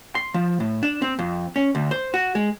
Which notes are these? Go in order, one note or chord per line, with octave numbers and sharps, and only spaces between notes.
C6
F3
A2
D4
C4
F2
C#4
D2
C5
F#4
G#3